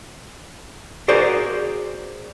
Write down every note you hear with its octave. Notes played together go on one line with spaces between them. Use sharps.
F#4 G#4 A#4 C5 D5